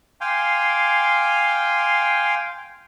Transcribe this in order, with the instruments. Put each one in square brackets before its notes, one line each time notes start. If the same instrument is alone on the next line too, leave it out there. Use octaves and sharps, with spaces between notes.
[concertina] F5 G5 G#5 C6 D6